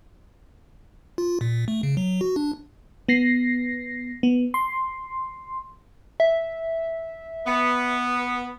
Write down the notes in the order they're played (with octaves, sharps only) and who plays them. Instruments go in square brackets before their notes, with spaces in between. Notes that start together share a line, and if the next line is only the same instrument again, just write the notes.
[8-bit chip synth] F4
A#2
A3
C#3
F#3
F#4
D4
[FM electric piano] B3 A#6 C7
B3
C6
[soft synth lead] E5
[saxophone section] B3